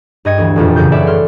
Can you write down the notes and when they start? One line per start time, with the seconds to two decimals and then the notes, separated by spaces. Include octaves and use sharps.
0.25 G2 D#5 G#6 C#7
0.38 D2 E3
0.56 E1 A1 F2 A#2
0.76 F#1 F#2 C#3 G6
0.92 E4 A4 B4 C#5 D5 E5
1.07 C6 F6